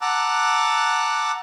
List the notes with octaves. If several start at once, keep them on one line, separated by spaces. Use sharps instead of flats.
F#5 A5 A#5 D6 E6 F#6